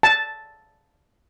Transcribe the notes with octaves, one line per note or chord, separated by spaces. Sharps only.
A5